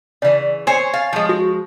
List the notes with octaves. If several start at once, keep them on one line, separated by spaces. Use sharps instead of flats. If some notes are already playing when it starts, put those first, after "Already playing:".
C#3 E3 D5
C5 C#5 G#5
F5 A6
F3 G#3
F#4